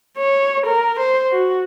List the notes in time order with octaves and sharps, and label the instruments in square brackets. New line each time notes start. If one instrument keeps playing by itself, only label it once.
[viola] C#5
A#4
C5
F#4